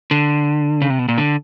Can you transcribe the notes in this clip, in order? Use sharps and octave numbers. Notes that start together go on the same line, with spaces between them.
D3
C#3
C3
B2
A#2
D3